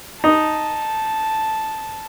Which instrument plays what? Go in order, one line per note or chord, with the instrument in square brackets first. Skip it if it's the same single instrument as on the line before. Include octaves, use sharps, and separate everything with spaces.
[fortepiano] D#4 [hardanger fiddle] A5